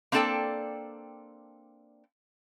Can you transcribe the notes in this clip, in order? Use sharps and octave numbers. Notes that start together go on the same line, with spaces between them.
A#3 C4 D4 A4 D5 G5